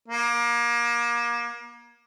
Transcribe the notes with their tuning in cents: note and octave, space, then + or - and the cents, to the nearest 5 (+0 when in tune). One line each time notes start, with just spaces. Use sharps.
A#3 +30